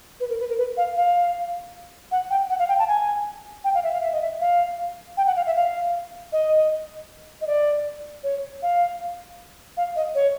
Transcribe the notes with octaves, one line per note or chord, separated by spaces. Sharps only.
B4
A#4
B4
A#4
B4
F5
F5
F#5
G5
F#5
F5
G5
A5
G#5
G5
F5
E5
F5
E5
D#5
E5
F5
G5
F#5
F5
E5
F5
D#5
D#5
D5
C#5
F5
F5
D#5
C#5